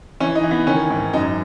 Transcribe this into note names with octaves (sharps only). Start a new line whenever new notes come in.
E3 C#4
D#4
E3
B3
D#3 C#4
G#2
F#2 D#4